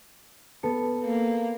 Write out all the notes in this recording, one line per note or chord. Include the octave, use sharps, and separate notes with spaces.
B3 A4 C#7
A#3